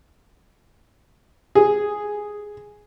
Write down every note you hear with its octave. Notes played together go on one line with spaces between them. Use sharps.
G#4